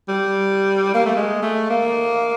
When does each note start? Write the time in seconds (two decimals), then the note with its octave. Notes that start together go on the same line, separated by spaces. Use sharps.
0.09 G3
0.94 A#3
1.05 A3
1.16 G#3
1.42 A3
1.70 A#3